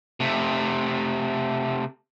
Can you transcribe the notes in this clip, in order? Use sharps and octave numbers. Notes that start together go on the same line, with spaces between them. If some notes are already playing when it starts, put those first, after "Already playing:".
C3 A3